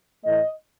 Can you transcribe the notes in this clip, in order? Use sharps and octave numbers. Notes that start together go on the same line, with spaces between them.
A2 E3 A3 D#5